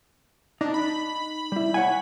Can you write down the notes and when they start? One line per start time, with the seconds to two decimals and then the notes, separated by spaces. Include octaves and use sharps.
0.61 D4 D#4
0.74 B5
1.52 G3 E4
1.74 C#5 F#5 G#5